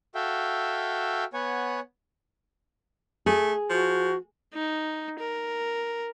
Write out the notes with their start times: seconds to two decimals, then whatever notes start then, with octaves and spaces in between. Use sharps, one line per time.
0.15 F#4 A4 E5 F5 G5
1.34 B3 C#5 F#5 G#5
3.26 A3 G#4
3.70 F3 F#4
4.54 D#4
5.20 A#4